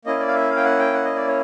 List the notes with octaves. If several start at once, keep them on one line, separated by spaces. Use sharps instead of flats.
A#3 C#4 E4 D#5
D5
F5
E5
F5
G5
F#5
G5
F#5
D#5
D5
C#5